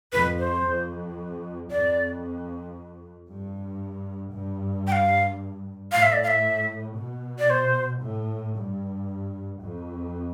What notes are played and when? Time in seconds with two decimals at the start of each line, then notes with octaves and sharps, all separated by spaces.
0.12 F2 B4
0.39 C5
0.65 F2
1.70 F2 D5
3.29 G2
4.34 G2
4.87 G5
4.92 F5
5.92 A2 F5
6.03 E5
6.13 D5
6.23 F5
6.28 E5
6.98 B2
7.39 D5
7.50 C5
8.02 A2
8.56 G2
9.61 F2